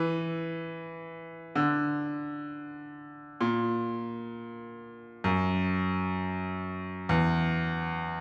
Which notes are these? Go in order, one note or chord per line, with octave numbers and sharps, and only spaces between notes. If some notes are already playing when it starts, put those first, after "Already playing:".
Already playing: E3
D3
A#2
F#2
E2